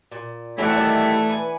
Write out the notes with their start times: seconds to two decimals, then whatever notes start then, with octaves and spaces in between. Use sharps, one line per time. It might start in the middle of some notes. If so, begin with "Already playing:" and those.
0.12 A#2
0.58 E3 F#3 A3 C4 E4 D5 F#5
0.74 D#3 G3 E5
1.29 B4 G#5